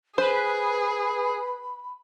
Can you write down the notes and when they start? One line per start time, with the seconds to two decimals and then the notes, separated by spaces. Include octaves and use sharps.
0.18 G#4 B4 C5 B5